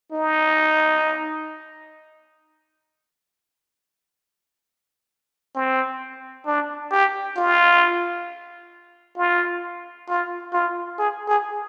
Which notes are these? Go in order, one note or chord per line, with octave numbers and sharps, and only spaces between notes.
D#4
C4
D4
G4
F4
F4
F4
F4
G#4
G#4